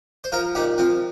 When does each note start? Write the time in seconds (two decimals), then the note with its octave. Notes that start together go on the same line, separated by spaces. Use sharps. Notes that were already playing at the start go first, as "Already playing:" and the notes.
0.24 C5
0.32 F3 F4 A#4
0.55 A#2 D#4 G4
0.78 F3 C4 F4